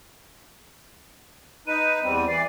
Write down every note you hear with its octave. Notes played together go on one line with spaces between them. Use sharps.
D#4 B4 D#7
E2 G3 C4
E3 D5 C7